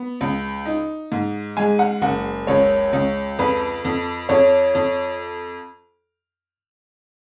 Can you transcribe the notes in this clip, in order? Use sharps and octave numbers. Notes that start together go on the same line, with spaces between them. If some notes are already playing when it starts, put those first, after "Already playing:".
Already playing: B3
C#2
D#4
G#2
G#3 G#5
F#5
F#1 F#5
C#2 C#5
C#2
F2 B4
F2
F2 C#5
F2